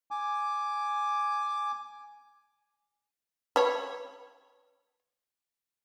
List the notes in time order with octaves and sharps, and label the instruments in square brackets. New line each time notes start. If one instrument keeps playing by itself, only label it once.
[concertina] G#5 D6
[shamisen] B4 C#5